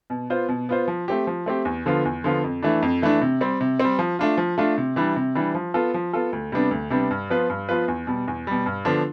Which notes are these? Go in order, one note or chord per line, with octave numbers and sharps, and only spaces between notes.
B2
B3 F4 C5
B2
B3 F4 C5
F3
A3 C4 G4
F3
A3 C4 G4
E2
D3 F3 B3 F4
E2
D3 F3 B3 F4
F2
E3 A3 D4
F2
E3 A3 D4
C3
G3 C4
C3
G3 C4
F3
A3 D4 F4
F3
A3 D4 F4
C3
E3 G3 D4
C3
E3 G3 D4
F3
B3 F4 A4
F3
B3 F4 A4
D2
C3 G3 B3 D4
D2
C3 G3 B3 D4
G2
F3 B3 F4 B4
G2
F3 B3 F4 B4
E2
B2 G3
E2
B2 G3
G2
D3 F3 B3 D4